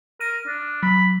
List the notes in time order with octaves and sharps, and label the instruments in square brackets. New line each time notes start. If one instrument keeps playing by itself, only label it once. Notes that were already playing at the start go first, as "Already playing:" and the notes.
[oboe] A#4 [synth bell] F6 D#7
[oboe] D4
[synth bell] F#3 [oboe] B5